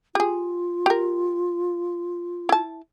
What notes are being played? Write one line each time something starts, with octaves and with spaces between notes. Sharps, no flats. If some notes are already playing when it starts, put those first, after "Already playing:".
F4 G4 G#4
G4 A#4
E4 A5